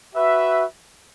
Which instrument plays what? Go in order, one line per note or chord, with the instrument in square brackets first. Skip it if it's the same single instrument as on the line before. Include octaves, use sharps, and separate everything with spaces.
[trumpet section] F#4 B4 E5